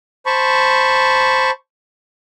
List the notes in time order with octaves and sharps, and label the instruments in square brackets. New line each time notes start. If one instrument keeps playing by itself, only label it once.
[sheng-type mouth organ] C5 A5 B5 C#6